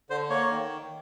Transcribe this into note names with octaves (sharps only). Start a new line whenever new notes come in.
D3 C5
A#3 C#5
D#3